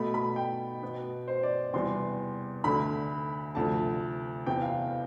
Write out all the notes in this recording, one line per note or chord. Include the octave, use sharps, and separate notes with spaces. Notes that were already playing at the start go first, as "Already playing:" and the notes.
Already playing: B2 A3 B5
B5
G5
B2 B3
C5
D5
E2 C3 G3 B3 C6
D2 D3 A3 B5
D2 C3 F3 A3 A5
E2 C3 E3 B3 G5
F5